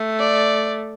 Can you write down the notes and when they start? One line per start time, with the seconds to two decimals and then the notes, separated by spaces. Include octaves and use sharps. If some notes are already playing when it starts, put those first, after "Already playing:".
Already playing: A3
0.19 D5